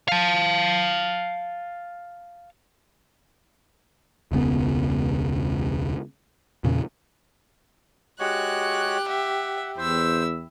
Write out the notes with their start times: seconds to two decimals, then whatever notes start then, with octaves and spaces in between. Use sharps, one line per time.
0.08 F5 A5
4.32 E1 C#2 C#3 B3
6.64 E2 A#2 C#3
8.20 G#3 F#4 G4 C#5 F#6
9.08 E5 F#5
9.77 E2 E4 C5 E6